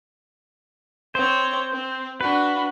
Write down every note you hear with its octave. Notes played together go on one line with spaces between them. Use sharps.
C4 C5 C#5
C4
D4 F#4 B4